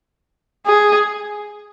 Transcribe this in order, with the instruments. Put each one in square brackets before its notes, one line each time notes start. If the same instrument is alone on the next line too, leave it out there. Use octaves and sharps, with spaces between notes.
[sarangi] G#4